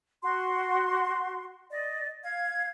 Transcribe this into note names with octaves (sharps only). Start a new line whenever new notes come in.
F#4 C6
D5 D#5
F5 G#6